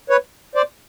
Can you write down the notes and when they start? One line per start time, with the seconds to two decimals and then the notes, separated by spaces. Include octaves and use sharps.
0.10 B4 C#5
0.55 C5 D5